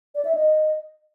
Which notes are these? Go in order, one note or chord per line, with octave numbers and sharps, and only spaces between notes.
D5
E5
D#5